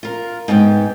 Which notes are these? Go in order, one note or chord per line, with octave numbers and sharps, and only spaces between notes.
F4 A#4
G#2 B3 G4 C5 G5